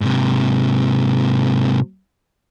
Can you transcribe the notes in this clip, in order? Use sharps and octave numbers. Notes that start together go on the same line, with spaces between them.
G#2 C3